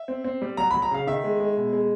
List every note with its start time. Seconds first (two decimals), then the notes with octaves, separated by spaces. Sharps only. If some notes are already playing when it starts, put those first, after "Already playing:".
Already playing: E5
0.08 C4
0.24 C4
0.42 G3
0.57 F#3 A#5
0.71 F#3 B5
0.82 A#5
0.91 C#3 F5
1.07 D#3 E5
1.24 G#3
1.40 G#3
1.57 B2
1.73 G#3